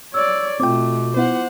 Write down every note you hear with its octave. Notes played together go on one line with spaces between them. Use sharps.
C#5 D5 E6
B2 A3 C4 F4 G5 D6
B3 E4 C5 F#5